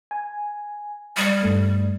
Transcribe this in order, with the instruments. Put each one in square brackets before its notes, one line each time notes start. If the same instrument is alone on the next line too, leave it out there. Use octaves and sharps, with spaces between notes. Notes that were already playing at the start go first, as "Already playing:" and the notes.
[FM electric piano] G#5
[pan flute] G3 [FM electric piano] D#6 F6 G#6
[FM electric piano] G2 A3